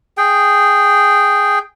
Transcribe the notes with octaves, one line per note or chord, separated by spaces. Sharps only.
G#4 G5